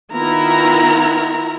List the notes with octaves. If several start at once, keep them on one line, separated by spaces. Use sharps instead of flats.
D#3 B3 E4 F4 A#5